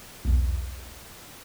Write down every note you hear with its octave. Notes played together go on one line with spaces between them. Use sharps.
B1 E2